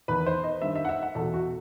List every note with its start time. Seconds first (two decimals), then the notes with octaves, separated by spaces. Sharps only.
0.08 E2 D#3 B4
0.26 C5
0.44 D#5
0.62 G2 D#3 E5
0.76 E5
0.85 F#5
0.89 E5
1.02 F#5
1.15 E2 B2 A4
1.34 F#4